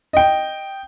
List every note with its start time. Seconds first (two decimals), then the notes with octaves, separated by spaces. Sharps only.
0.13 D#5 G5